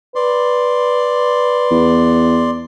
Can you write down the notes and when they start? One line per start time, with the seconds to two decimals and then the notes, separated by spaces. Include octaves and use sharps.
0.15 B4 D5 C6
1.71 E2